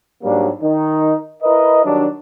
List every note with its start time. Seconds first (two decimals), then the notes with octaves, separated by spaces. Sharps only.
0.24 G#2 F#3 G3 A#3 D4
0.62 D#3 D#4
1.43 E4 A#4 B4 D#5
1.85 D#3 F#3 G3 D4